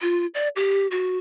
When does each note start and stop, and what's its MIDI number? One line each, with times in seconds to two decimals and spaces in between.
0.01 0.26 65
0.35 0.48 74
0.56 0.87 67
0.91 1.18 66